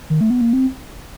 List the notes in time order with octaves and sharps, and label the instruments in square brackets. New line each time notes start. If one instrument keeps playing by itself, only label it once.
[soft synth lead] D#3
A3
B3
A#3
C4